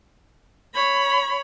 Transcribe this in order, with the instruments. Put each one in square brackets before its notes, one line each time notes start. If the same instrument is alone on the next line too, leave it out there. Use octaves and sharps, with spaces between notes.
[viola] C#5 B5